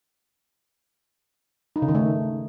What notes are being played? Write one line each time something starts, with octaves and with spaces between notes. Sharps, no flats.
D#4
C#3
D#3
A3